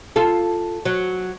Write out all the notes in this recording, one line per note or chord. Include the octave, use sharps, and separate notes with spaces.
F4 A4
F#3